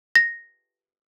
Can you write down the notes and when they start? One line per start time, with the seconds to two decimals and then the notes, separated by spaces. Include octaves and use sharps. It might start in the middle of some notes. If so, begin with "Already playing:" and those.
0.15 A#6